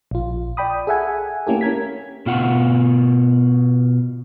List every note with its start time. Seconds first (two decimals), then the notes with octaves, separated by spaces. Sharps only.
0.11 A#1 F4
0.57 D5 G5 B5 D#6
0.87 G#4 A4 E5 F#5 G#5
1.47 A3 A#3 C#4 E4 G4 A4
1.61 C#4 A#4 G#6 B6
2.26 B2 F4 F#5